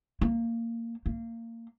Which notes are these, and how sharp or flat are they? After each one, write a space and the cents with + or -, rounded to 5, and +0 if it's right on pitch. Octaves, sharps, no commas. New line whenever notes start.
A#3 -15
A#3 -25